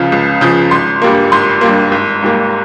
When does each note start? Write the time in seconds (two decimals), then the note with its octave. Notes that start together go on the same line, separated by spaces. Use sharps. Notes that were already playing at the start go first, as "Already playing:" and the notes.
Already playing: C#2 C#3 F3 F5
0.12 C#2
0.41 C#3 F3
0.71 G#1 C6
1.02 G2 G3 A#3
1.32 G#1 C6
1.61 G2 G3 A#3
1.92 G#1
2.23 G#2 G3 A#3